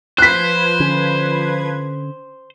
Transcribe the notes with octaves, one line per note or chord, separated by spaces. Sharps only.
F3 B4 C5 F#6 G#6 B6
D3 C#4